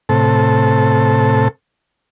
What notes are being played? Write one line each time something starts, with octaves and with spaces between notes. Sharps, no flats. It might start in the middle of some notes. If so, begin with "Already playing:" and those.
A2 C3 A4